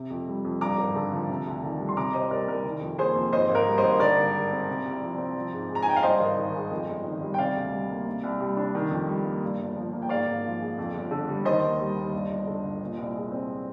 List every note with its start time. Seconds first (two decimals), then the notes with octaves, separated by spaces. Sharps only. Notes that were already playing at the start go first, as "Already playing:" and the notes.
Already playing: C3
0.10 F2
0.28 G3
0.45 F2
0.61 G2 A#5 D6
0.78 G#1
0.95 D3
1.12 F3
1.29 C3
1.46 D2
1.63 D#3
1.79 G3
1.89 C6
1.96 C3 A#5 D6
2.13 C2 C5 D#5
2.31 G3 A#4 D5
2.47 C2 A#4
2.65 D#3
2.81 F2
2.98 A#3 G#4 C5
3.15 F2
3.32 G#2 C5 D#5
3.49 G#1
3.55 A#4
3.66 G3
3.78 C5 D#5
3.83 G#1
4.00 D3 A#4 D5
4.16 G2
4.34 G#3
4.51 C4
4.68 C3
4.85 C2
5.01 F3
5.18 C4
5.36 F3
5.53 G#2
5.69 G#3
5.75 A#5
5.82 G#5
5.86 D#4 G5
5.96 F5
6.03 G2 C5 D#5
6.20 G#1
6.37 D#3
6.55 G#3
6.71 F2
6.88 G1
7.04 D#3
7.22 G3
7.34 G5
7.38 C3 D5 F5
7.56 D2
7.73 G3
7.90 A#3
8.07 C3
8.24 C2
8.40 G3
8.57 D4
8.75 D#3
8.91 F2
9.09 G3
9.25 A#3
9.43 G2
9.59 G1
9.76 F3
9.93 A#3
10.02 G5
10.09 G#2 D5 F5
10.26 G#1
10.44 F3
10.60 G#3
10.78 F2
10.94 G1
11.11 D3
11.28 G3
11.45 D#3 C5 D#5
11.62 D#2
11.80 G3
11.97 D#2
12.13 G2
12.30 G1
12.47 D3
12.63 G1
12.81 A#2
12.97 C2
13.15 G#3
13.32 C4